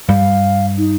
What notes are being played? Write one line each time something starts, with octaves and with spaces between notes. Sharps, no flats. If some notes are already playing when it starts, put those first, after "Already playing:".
G2 G3 F5
D#4